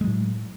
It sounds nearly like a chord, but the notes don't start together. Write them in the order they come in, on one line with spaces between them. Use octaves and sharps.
G#3 F#3 A2